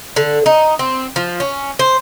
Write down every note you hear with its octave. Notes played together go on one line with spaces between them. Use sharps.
D3
D#4
C4
F3
C#4
C5